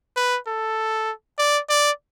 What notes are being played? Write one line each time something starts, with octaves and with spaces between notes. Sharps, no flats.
B4
A4
D5
D5